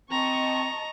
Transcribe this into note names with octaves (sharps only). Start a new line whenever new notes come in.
C4 D#5 A5 A#5 C#6